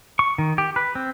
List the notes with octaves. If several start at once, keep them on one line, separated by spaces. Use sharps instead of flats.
C#6
D#3
G4
B4
C4